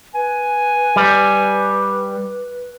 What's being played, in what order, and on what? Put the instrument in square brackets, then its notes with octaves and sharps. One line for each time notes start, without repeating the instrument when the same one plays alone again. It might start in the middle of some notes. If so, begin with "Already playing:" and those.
[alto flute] B4 [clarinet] G#5
[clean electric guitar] G3